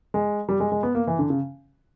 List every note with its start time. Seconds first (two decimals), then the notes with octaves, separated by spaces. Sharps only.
0.14 G#3
0.49 G3
0.60 G#3
0.72 G#3
0.83 B3
0.95 A#3
1.07 E3
1.19 D3
1.30 C#3